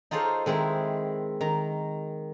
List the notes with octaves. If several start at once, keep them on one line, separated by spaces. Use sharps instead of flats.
D#4 F4 G#4 A4 C5 C#5
D#3 G#3 C4 E4
D#3 A#5